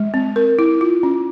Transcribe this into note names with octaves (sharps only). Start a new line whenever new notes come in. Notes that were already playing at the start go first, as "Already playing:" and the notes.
Already playing: G#3
C4
A#4
E4
F4
C#4